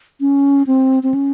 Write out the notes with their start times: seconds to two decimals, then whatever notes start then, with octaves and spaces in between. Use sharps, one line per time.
0.20 C#4
0.67 C4
1.03 C4
1.14 C#4